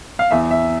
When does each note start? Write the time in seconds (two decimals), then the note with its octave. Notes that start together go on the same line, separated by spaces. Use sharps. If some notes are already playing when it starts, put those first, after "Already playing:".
0.19 F5
0.31 E2 E5
0.51 E5